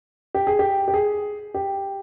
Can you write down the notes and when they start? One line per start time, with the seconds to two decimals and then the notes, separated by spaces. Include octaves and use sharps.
0.34 G4
0.47 G#4
0.59 G4
0.88 G4
0.94 G#4
1.54 G4